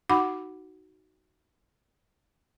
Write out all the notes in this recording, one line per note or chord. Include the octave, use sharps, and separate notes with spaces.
D#4 F#4 F#5 B5 D6